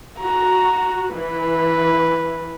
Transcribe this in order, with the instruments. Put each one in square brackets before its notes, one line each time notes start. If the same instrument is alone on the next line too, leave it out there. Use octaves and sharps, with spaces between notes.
[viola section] F#4 [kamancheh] A#5
[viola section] E3 [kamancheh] B4